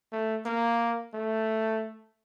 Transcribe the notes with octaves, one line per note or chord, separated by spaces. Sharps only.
A3
A#3
A3